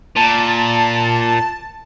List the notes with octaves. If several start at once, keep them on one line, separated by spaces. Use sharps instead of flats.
A#2 A5